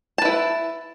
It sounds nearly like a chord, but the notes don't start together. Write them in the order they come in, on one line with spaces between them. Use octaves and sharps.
A5 B4 E4